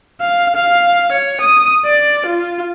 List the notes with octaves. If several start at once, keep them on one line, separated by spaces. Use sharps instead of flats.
F5
F5
C#5
D#6
D5
F4